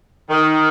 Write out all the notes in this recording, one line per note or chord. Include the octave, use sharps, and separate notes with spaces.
D#3